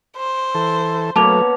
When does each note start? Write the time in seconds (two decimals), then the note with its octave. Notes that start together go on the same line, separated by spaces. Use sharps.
0.18 C5
0.55 E3 A4
1.16 B2 F#3 A3 A#3 C#4 A5 D6 F7